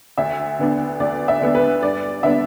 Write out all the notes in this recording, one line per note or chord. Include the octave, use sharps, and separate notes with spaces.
D2 E5
D3 B3 D4
D2 D5
E5
D3 B3 D4
B4
G2 D5
D3 B3 D4 E5